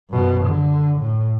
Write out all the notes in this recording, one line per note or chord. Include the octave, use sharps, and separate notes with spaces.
F#2 B2
D3
A2